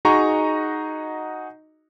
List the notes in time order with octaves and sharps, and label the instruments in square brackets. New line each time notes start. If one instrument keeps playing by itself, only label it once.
[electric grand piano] D#4 F#4 G#4 D#5 A#5 C#6